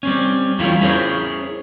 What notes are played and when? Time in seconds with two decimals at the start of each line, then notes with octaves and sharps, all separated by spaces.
0.03 G3 C4 C#4
0.59 E2 F#3 G3 A3 E4 F4
0.81 C#4 E4 G#4 A#4 C5 C#5